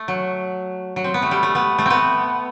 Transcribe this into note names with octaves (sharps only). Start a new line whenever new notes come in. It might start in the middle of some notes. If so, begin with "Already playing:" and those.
Already playing: A3
F#3
F#3
C4
B3
A3
G3
A3
B3
A3
B3 C4